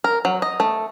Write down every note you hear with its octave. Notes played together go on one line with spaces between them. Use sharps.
A#4
F#3
D#5
A3